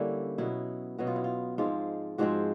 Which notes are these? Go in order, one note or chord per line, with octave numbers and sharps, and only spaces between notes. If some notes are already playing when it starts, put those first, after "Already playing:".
Already playing: D3 G3 A#3 C#4 E4
B2 F#3 B3 E4
B2 F#3 B3 F#4
F4
E4
F4
G#2 F3 G#3 C4 F4
G#2 F3 G#3 C4 F#4